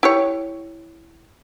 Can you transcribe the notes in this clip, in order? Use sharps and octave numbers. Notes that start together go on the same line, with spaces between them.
E4 G4 C#5